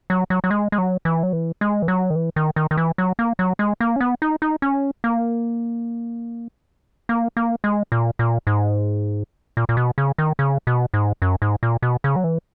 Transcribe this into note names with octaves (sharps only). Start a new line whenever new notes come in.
F#3
F#3
F#3
G#3
G#3
F#3
E3
F#3
E3
G#3
E3
F#3
D#3
E3
D#3
D#3
D#3
E3
F#3
A#3
F#3
G#3
A#3
C#4
B3
D#4
D#4
C#4
A#3
A#3
A#3
G#3
A#2
A#2
G#2
A#2
A#2
B2
C#3
D#3
C#3
B2
G#2
F#2
G#2
A#2
B2
C#3
F#3
E3